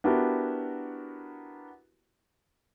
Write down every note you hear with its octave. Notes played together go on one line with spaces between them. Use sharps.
B3 D4 E4 F#4 G4 A#4